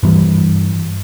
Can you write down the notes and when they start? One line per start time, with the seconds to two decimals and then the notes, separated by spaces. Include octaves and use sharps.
0.03 G2 E3 G3